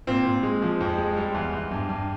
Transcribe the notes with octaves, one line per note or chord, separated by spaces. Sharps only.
A#2 C4
A#2
G#3
F3
F2
G#3
G3
E2
E2
G2
G2